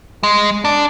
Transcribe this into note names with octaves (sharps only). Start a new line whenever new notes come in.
G#3
D4